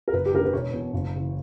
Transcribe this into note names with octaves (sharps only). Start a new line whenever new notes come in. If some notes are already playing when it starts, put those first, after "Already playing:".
A#4
F#1 B4
G4
F#2 D3 A#4
B4
E1 C#5
E2 B2
F#1
F#2 C#3 E3